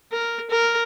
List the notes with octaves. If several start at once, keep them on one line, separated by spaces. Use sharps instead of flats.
A#4
A#4